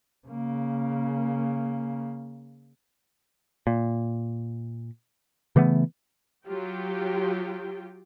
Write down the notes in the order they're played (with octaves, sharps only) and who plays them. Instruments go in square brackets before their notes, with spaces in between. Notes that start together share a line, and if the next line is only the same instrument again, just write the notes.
[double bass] C#3 A#3
[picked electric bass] A#2
C#3 E3 A3 B3
[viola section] F#3 F4 G4 G5